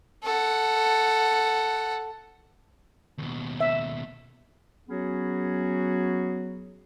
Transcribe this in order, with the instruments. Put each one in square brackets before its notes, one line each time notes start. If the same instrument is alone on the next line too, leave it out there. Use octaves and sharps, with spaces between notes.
[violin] A4 F#5
[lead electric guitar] D#2 B2
[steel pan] E5
[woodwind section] F#3 B3 C#4 F#4 G#4